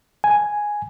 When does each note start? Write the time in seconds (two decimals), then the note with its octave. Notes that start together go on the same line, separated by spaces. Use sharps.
0.24 G#5